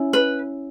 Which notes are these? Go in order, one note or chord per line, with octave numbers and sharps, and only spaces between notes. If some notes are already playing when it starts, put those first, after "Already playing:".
Already playing: C#4 E4
B4